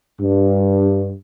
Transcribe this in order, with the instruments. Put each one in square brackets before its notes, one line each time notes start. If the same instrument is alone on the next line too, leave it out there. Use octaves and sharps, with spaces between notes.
[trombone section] G2